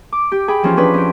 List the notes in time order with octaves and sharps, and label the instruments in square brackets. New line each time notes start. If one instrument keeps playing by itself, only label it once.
[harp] D6
G4
G#4 G5 B5
E3 F3 C#4 F4
C#4 D4 G#4 B4
F2 G5